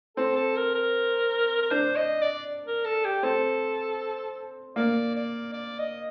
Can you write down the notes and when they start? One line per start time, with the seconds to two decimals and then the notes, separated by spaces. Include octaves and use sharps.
0.17 C4 A4
0.36 A4
0.56 A#4
0.75 A#4
1.62 A#4
1.71 D4 C5
1.96 D#5
2.22 D5
2.67 A#4
2.85 A4
3.05 G4
3.23 C4 A4
4.76 A#3 D5
5.15 D5
5.53 D5
5.78 D#5